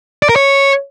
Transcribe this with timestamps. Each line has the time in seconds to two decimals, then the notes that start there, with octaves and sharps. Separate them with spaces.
0.23 D5
0.29 A#4
0.36 C#5